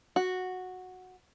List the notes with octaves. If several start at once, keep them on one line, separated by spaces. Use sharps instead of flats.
F#4